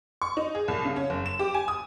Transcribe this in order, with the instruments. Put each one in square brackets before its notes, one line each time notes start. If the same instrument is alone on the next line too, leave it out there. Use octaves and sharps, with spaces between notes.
[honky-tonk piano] C#6
D#4
G#4
C2
C#3
C#4
F#1
E7
G4
G#5
D#6